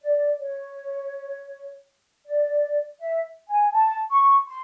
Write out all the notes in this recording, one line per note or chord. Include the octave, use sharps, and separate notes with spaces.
D5
C#5
D5
E5
G#5
A5
C#6
C6